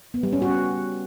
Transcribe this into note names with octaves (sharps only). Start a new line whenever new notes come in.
B3
G3
C#4
F#4